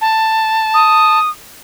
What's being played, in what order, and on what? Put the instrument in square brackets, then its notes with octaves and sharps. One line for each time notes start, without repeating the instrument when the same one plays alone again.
[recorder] A5
[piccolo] D#6